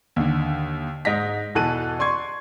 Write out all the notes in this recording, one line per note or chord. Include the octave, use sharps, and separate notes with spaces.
D#2 D3
G#2 D#4 A#6 B6
E2 B2 E3 A4 F#6 D#7
D5 C6 C#6 G#6